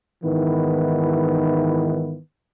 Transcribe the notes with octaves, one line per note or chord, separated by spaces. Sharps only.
G#2 D#3 E3 B3 E4 B4